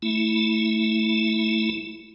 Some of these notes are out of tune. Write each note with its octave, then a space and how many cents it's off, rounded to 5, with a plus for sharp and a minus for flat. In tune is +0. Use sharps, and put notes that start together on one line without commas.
A3 +0 E4 -10